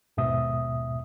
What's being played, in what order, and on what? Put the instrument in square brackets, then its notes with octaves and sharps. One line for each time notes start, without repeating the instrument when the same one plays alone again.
[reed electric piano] D#2 G#2 B2 E5 D#6